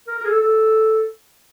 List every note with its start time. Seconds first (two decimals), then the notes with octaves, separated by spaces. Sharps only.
0.07 A#4
0.18 A#4
0.25 G#4
0.29 A4
0.40 A4